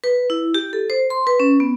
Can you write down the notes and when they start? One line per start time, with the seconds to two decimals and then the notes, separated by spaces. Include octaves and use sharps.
0.04 B4
0.30 E4
0.54 G4
0.73 A4
0.90 C5
1.10 C6
1.27 B4
1.40 C#4
1.60 B3